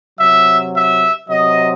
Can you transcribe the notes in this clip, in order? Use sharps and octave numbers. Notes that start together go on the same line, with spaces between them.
C3 F#3 E5
E5
C3 F#3 D#5